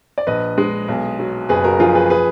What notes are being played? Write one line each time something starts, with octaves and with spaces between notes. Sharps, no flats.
D5
A#1 B4 D#5
G#3
B1
F#3
F#1 G#4 B4
F#4 A#4
F3 F4 G#4
G#4 B4
G#4 B4